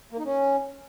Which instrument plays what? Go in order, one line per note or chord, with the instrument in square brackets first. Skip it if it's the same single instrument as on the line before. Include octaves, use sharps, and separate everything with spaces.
[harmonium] A#3
D#4
C#4